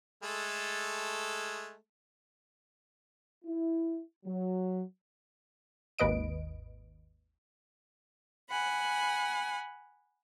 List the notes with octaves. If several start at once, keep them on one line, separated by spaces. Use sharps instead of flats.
G#3 A3 A4
E4
F#3
G#1 D#2 B4 D#5 D7
F#5 G#5 B5